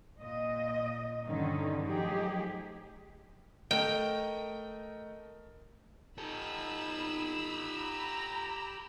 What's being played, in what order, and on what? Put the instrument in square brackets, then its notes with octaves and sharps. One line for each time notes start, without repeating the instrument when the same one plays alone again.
[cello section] A#2 D#5
G2 D3 D#3 C#4 D#4
F3 F#3 A3 D#4 G4 G#4
[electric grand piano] A3 A#4 D#5 [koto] G5
[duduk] D#4 [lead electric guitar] G4 A4 [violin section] B5 E6
[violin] A#5